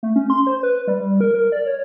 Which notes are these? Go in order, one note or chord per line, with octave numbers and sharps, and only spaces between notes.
A3
C#4
C6
C5
B4
G3
A#4
A#4
D5
C#5